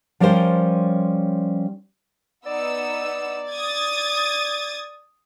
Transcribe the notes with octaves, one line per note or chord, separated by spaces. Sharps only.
F3 G3 C#4 A#4 C5 G5
B3 D#4 D5 E6
D#6 G#6 A6